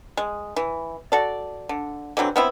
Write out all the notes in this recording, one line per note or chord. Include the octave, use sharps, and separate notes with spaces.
G#3
E3
F#4 A4 D5
D3
D3 E3 F#3 C4
B3 C4 E4